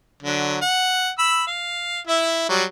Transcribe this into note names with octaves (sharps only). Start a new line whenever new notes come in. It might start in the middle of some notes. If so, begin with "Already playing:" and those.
D3 F#3
F#5
B5 E6
F5
E4 E5
F#3 G3